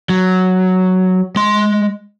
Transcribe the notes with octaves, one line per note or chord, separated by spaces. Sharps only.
F#3
G#3 C6